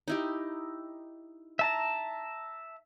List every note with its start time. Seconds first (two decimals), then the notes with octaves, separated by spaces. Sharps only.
0.08 D#4 E4 G4
1.59 E5 A5 A#5